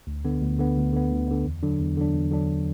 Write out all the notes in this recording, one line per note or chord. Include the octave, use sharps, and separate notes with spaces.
D2
D3 B3
D2
D3 B3
D2
D3 B3
D2
D3 B3
E2
D3 F#3 D4
E2
D3 F#3 D4
E2
D3 F#3 D4